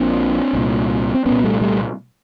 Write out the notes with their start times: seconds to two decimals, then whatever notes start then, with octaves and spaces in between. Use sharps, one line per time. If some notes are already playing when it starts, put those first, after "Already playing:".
Already playing: A#1 A#2 C4 D4
0.53 C2 A#2
1.14 C4
1.25 C2 A#2 B3 C#4
1.44 G3 A3
1.61 G3 A3